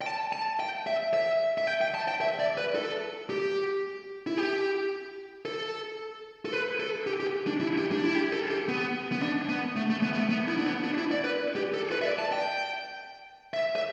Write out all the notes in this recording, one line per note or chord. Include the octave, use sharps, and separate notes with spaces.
G5
A5
A5
G5
E5
E5
E5
G5
G5
A5
G5
E5
D5
B4
A4
G4
E4
G4
A4
A4
B4
A4
G4
G4
D4
E4
G4
D4
E4
G4
A4
G4
B3
B3
D4
B3
A3
A3
B3
B3
A3
B3
E4
D4
B3
D4
E4
D5
B4
G4
A4
B4
E5
D5
A5
G5
E5
E5